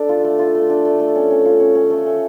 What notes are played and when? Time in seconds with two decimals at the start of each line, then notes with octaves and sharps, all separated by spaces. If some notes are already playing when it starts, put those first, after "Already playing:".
Already playing: D4 A4
0.09 F4
0.25 A3
0.39 F4
0.55 A3
0.70 D4
0.85 A3
1.00 A3
1.16 C#4
1.31 C#4
1.46 F4
1.60 C#4
1.75 C#4
1.90 A3
2.06 A3